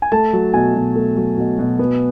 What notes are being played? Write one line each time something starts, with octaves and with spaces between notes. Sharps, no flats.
G#5
A3 A5
F#3
B2 G#5
B2
A3
F#3
B2
B2
B3